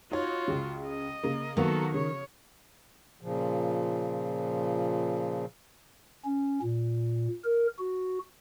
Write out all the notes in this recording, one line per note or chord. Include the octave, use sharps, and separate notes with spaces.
D#4 F4 F#4 C#5
C#2 C#3
D#5
C#3 A#3
D#3 F#3 A#3 B3 F#4 A4
C#3 C#5
A#2 C#3 F3
C#4
A#2
A#4
F#4